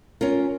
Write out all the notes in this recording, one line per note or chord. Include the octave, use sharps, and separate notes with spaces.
C#4 F4 A#4